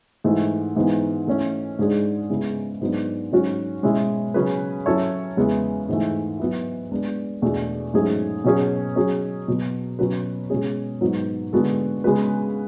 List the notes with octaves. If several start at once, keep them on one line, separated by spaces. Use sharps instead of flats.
G#2 E3 A3
G#2 E3 B3
E3 A3 C#4
G#2 G#3 D4 G#4
C#3 G#3 B3 E4
G#2 F#3 B3 D4
G#2 F#3 C#4 F#4
B2 G#3 C#4 E4
C#3 F#3 C#4 G#4 B4
F#3 C#4 E4 A4 C#5
E2 C#3 G#3 B3 E4
G#2 E3 A3
F#3 B3 E4
G#3 B3 D4
E2 B2 A3 D4 G#4
G#2 F#3 A3 C#4 G#4
B2 F#3 C#4 G#4 C#5
F#3 C#4 G#4
B2 F#3 B3
B2 F#3 C#4 F#4 B4
B2 G#3 C#4 G#4
G#2 F#3 B3 F#4
D3 G#3 B3 F#4 A4
C#3 G#3 B3 F#4 B4